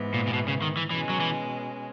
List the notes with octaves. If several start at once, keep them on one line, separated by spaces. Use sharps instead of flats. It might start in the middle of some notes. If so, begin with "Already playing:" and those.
Already playing: G#2 E3 B3
A#2
A#2
B2
C#3
D#3
E3
B2 E3 G#3 C#4
F#3
E3